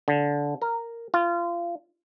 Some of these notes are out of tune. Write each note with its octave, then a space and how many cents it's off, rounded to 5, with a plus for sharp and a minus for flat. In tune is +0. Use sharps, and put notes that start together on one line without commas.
D3 -15
A#4 -10
F4 -25